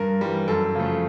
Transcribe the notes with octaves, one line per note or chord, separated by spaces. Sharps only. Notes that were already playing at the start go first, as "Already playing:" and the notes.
Already playing: G2 A#4
E3 G3
F#2 A4
C#3 F3 A3